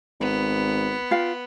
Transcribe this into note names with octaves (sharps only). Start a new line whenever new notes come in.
G#1 B3
F4 F5 G5